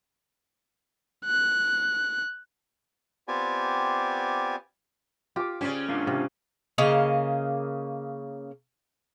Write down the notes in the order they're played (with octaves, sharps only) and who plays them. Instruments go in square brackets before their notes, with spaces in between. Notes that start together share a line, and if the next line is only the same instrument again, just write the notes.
[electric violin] F#6
[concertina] B3 C4 F4 G4 D5 G#5
[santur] F4 D6 [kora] G4
[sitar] C#3 C#4 [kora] G4 C5 D5
[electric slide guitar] G#2 D4 F4 [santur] A#3
[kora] C3 [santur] F5
[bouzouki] C#3 A#3 D#5 F5